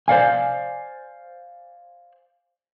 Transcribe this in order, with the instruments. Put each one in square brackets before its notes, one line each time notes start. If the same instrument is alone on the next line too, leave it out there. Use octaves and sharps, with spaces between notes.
[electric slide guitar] C5 D5 F5 G#5